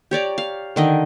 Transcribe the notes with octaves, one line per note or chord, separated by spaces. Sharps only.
G4 C#5 D5 A#5
F5
D3 D#3 D#5